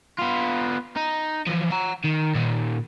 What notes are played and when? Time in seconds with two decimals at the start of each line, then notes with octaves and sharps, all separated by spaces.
0.18 B3 F4
0.97 D#4
1.47 E3 F3
1.71 F#5 A#5
2.04 D#3
2.35 A#2 D#3